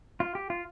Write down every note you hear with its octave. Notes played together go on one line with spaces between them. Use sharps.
F4
G4
F4